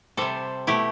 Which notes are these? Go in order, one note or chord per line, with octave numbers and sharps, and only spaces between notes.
C3 G3 A4 C5
B2 A3 E4 G4